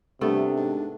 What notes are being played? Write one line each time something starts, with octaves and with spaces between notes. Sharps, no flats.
G2 C3 A3 B3 D4
G#2